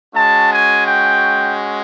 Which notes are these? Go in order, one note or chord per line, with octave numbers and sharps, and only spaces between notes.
G#3 C#4 F#4 A5
G#5
G5